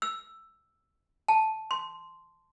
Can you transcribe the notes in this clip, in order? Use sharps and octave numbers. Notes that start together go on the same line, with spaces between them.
E6
A5
C6